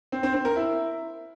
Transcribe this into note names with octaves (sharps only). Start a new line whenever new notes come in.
C4
C4
C4
A#4
E4